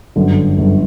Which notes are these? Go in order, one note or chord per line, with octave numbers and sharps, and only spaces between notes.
G1 F#2 D3
G1 F#2 D3